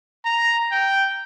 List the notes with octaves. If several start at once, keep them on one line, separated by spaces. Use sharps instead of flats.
A#5
G5